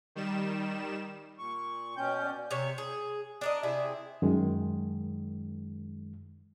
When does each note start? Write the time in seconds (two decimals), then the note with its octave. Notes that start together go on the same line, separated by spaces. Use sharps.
0.15 D#3 G3 E7
1.38 A#2 C#6
1.97 B2 C#4 G5 G6
2.22 D5
2.51 C3 C#5
2.78 G#4
3.41 D4 A#4 D#5
3.63 C3 E4 G#4
4.22 F#2 D#3 G#3